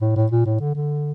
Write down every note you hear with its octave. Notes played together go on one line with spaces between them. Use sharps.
A2
A2
A#2
A2
D3
D3